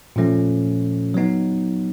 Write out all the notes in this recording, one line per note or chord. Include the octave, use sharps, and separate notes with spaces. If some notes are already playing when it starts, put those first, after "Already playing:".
A#2 F3 A3 C#4
F#3 B3 D#4